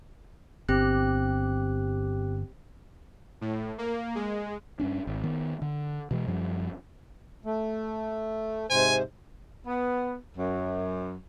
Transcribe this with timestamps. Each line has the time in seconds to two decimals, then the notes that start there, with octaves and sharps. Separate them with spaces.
0.69 G1 C4 G4 F#6
3.41 A2
3.78 A#3
4.15 G#3
4.80 G2 C#4 D4
5.07 G#1
5.24 D#3 B3
5.62 D3
6.11 B2 E3 G#3
6.27 F#2 F3 G3
7.45 A3
8.70 G#2 C3 C5 G#5
9.67 B3
10.37 F#2